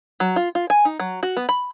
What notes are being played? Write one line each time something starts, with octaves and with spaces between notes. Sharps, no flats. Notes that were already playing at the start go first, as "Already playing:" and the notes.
F#3
F4
F4
G#5
D#4
F#3
F#4
B3
B5